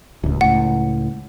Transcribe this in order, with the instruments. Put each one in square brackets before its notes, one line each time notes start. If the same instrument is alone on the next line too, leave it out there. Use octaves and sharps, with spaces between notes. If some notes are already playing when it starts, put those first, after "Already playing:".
[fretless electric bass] D1 C#2
[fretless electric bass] C#2 A2 [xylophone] F#5